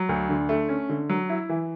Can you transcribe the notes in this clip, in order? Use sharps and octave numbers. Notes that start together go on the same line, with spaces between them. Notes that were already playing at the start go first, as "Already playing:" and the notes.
Already playing: F#3
D2
D3
A3
C#4
D3
F#3
E4
E3